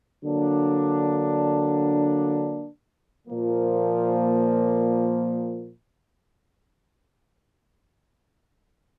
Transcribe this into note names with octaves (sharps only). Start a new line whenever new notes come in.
D3 F#3 A#3 D4
A#2 F3 A#3